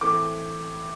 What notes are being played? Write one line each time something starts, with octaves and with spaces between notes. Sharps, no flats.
A2 E3 A3 C4 D6